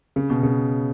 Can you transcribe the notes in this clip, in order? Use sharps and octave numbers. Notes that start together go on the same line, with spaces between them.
C#3
B2
C#3